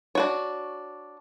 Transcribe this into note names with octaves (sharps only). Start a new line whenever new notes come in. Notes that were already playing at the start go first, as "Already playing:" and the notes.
D4 F#4 C#5